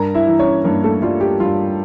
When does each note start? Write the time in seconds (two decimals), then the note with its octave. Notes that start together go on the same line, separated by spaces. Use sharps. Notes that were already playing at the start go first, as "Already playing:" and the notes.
Already playing: G2 A#4 A#5
0.14 E4 E5
0.27 E3
0.39 C#4 C#5
0.64 G2 A#3 A#4
0.83 A3 A4
1.02 G3 F4
1.21 G4
1.40 G2 F4